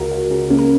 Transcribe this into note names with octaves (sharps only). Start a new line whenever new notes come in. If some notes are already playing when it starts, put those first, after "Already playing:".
Already playing: C#2 F#4 A#4
C#2
C#3
C#2 A#3 C#4
A#4